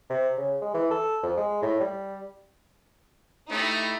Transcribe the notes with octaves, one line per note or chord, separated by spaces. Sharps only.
C3
C#3
G#3
E3
A4
F2
G#3
A2
G3
A3 D#4 E4 G4